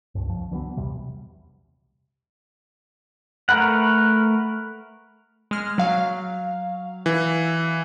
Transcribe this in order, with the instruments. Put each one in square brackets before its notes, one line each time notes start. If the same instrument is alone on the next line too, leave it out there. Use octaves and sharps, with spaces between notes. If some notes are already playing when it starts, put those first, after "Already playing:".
[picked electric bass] C#2 G2
C#2 F3
D3 E3 F#3 B3
B1 E2 C3 G3
[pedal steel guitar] A3 A#4 B4 F#5
[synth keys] G#3 F6
F#3 F5
[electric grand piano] E3